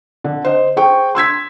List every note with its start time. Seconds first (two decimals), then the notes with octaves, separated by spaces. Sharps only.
0.24 D3
0.45 C5 D#5
0.77 G#4 C5 G5 C#6
1.15 C6 E6 G#6 B6